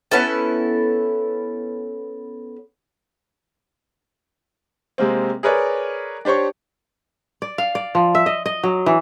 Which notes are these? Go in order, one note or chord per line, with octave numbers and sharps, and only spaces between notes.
B3 C#4 E4 A4
C3 G#3 A#3 C4
G#4 A#4 B4 C#5 D5
D4 G4 C5 C#5 C#6
D5
F5
D5
F3
E5
D#5
D#5
F#3
E3